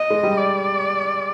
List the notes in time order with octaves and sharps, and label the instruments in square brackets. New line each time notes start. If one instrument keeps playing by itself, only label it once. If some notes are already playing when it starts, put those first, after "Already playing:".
Already playing: [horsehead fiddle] D#5
[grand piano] G#3
G3
[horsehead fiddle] D5